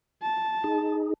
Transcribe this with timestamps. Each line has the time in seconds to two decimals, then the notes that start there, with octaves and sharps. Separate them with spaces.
0.23 A5
0.64 D#4 G#4